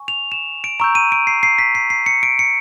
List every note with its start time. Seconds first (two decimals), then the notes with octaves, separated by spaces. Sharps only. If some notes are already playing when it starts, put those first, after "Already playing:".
Already playing: G#5 C#6
0.08 F7
0.32 E7
0.64 D7
0.80 A#5 C#6 E6 G6 D7
0.95 D#7
1.12 D7
1.27 C7
1.43 C7
1.59 B6
1.75 C7
1.90 C7
2.06 C#7
2.23 D7
2.39 C#7